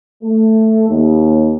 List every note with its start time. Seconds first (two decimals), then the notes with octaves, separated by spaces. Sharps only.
0.23 A3
0.89 D#2